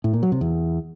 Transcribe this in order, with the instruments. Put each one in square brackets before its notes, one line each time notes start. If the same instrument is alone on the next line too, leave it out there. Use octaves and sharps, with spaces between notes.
[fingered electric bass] A2
A#2
F#3
C3
E2